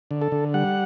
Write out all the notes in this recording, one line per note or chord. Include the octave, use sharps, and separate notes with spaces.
D3
A4
D3
G3 F#5